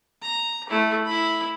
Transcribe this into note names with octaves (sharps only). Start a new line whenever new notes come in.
A#5
A3 E4
E4 B5